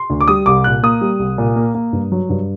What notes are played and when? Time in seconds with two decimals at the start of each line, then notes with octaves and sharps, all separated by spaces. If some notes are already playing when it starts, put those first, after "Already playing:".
Already playing: C6
0.10 D2
0.21 D6
0.28 G3 D#6
0.46 C2 D6
0.64 A#2 F#6
0.83 A#3 D#6
1.01 G3
1.19 C2
1.38 A#2
1.56 A#3
1.75 A#3
1.93 G2
2.12 F#3
2.29 G2